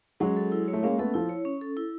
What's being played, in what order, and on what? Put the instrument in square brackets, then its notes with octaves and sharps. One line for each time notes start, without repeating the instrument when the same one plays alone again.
[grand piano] F#3 G#3 [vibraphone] C#4
[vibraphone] A4
E4
C#5
[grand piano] A3
[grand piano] G#3 A#3 [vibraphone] C#4
[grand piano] A3 B3 [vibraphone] A4
[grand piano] F3 [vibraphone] E4
[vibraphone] C#5
C#4
A4
E4